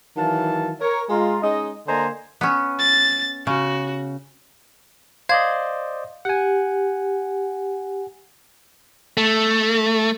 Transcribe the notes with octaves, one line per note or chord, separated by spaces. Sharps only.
D#3 E3 F#3 F5 A5
A#4 C#5
G#3 F4 A#5
G#3 C#4 D#4 D#5
D3 A#3 C5 D#5 G#5 A#5
B3 C#4
A6
C#3 F#4
C5 D5 D#5 F5 G#6
G4 F#5 G#5
A3